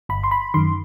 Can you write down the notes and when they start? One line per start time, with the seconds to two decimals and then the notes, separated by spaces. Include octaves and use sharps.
0.09 G1 B5
0.24 C6
0.31 B5
0.54 F#2 D#3 C6